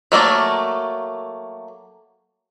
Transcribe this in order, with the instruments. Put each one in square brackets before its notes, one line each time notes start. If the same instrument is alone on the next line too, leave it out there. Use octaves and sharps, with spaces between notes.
[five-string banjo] F#3 A3 A#3 D5